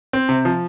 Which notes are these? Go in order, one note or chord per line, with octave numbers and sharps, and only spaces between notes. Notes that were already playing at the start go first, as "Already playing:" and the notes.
C4
C3
F3